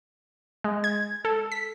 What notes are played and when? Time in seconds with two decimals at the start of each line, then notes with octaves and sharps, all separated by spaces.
0.64 G#3
0.84 G#6
1.25 A4
1.52 B6